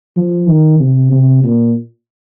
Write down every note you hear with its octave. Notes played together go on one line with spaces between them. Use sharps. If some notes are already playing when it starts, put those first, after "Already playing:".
F3
D#3
C3
C3
A#2